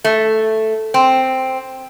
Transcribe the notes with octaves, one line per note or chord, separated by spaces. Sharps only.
A3
C4